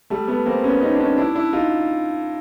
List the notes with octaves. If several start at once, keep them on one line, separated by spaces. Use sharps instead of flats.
G3 A3
A3 B3
A#3 C4
B3 C#4
C#4 D#4
D4
C#4 D#4
D4 E4
D4 E4
D#4 F4